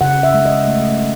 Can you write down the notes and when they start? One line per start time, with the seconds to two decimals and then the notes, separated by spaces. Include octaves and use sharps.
0.01 C#3 F#5
0.23 E5
0.34 G#3
0.45 D#5
0.68 A3